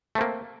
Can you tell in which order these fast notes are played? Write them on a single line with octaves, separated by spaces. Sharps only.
A3 C4 A#3